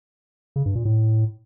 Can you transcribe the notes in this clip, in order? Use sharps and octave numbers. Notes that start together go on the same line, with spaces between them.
C#3
G2
A#2
A2